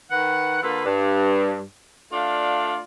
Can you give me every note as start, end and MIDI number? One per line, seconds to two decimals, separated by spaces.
0.11 0.62 51
0.11 0.62 71
0.11 0.62 78
0.63 0.82 50
0.63 0.82 58
0.63 0.82 65
0.63 0.82 69
0.63 0.82 71
0.86 1.62 43
2.12 2.79 57
2.12 2.79 62
2.12 2.79 65
2.12 2.79 74
2.12 2.79 77